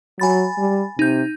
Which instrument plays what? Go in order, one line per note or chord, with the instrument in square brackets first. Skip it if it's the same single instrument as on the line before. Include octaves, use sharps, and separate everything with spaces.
[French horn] F#3 [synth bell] G#5 B5 A6
[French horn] G3
[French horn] C3 [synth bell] D#4 G6